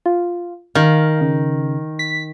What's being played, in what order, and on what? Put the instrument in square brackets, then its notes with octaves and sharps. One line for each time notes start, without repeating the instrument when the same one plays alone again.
[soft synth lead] F4
[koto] D#3 [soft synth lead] F5
[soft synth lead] C#3
B6